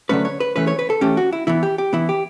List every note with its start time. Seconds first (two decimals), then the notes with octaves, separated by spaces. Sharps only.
0.09 D3 F#3 A3 C#4 B4
0.25 C#5
0.40 B4
0.56 E3 A3 C#4 B4
0.67 C#5
0.79 B4
0.90 A4
1.01 E3 A3 C#4 G4
1.17 F#4
1.33 E4
1.47 E3 B3 E4
1.63 G4
1.78 G4
1.93 E3 B3 E4
2.09 G4